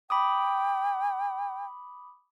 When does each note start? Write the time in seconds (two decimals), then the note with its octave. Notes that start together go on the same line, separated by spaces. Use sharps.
0.10 G5 B5 D6 D#6